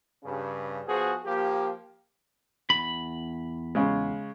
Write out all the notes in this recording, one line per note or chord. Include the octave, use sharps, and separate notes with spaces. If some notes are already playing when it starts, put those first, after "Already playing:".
G2 C#3
F3 B3 F#4 G#4 C5
F3 A#3 G4
E2 B5
C#3 G#3